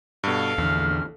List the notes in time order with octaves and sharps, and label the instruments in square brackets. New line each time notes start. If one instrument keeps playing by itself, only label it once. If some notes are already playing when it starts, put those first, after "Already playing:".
[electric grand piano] G2 B2 [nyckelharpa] A4 F5
[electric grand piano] A#1 [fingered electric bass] E2 D3 [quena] F6